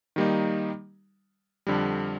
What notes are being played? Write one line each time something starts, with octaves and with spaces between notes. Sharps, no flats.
D#3 G3 A#3 D#4
F2 D3 G3